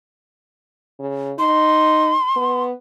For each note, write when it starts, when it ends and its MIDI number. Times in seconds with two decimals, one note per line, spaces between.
0.99 1.33 49
1.39 2.15 63
1.39 2.63 84
2.36 2.72 59